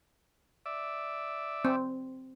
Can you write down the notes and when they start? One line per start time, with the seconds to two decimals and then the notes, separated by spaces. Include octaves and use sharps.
0.66 D5 E5
1.65 C4